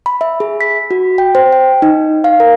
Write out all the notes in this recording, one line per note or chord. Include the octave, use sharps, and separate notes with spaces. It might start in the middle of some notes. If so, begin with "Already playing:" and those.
B5
E5
G#4
B6
F#4
G5
C5
G5
D#4
F5
A#4